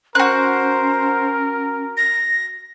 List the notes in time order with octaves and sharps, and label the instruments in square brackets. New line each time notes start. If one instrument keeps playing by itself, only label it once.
[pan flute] C#4 [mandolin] F#4 F#6 [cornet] A#4 [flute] C5
[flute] A#6